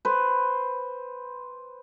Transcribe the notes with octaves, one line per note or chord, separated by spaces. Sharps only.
B4 C5